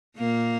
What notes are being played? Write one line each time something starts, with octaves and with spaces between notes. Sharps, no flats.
A#2 A#3